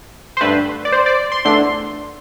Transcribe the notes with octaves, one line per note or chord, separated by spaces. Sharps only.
C5
G2 D3 A3 B4
D5
C5
D5
C6
E2 D3 A3 D4 C6